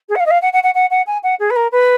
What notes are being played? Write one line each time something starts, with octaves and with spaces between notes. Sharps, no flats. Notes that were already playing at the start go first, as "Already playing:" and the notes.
G#4
F#5
F5
D#5
F5
F#5
F#5
F#5
F#5
F#5
G#5
F#5
G#4
B4
A#4
B4